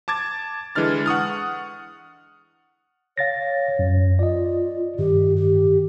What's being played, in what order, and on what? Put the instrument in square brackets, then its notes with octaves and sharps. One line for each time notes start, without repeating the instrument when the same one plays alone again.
[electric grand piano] A5 D6 G#6 A6
D3 E3 G#3 D4 F6 A6
F#5 C#6 D#6 F6
[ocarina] C#5 [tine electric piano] F5 A6 A#6
[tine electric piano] F#2
[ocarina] F4 [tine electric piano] D5 D#5
[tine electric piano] G2 D#3 [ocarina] G4
[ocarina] G4